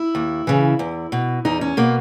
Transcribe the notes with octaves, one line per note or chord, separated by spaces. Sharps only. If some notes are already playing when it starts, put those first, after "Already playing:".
Already playing: E4
D#2
C#3 E3
E2
B2
E2 D#4
C#4
B2 A#3